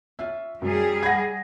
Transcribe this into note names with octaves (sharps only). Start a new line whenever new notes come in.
C#4 F4 E5
F#2 G3 G#4
F#5 B5 G#6 A#6